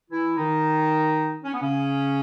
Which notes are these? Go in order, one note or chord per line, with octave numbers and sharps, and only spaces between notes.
E3 E4
D#3 D#4
C#4
B3
C#3 C#4